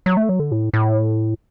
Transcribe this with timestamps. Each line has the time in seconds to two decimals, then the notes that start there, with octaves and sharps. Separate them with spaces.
0.06 F#3
0.17 A3
0.29 F#3
0.40 D3
0.52 A2
0.74 A2